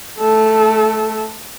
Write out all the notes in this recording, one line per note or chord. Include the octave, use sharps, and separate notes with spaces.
A3 A4